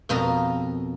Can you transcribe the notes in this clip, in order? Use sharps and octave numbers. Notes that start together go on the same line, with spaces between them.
F2 B2 F4 A#4 A#5